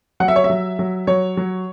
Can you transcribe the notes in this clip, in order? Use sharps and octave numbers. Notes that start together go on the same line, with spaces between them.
F#3 F#5
E5
C#5
E5
F#3
F#3
F#3 C#5
F#3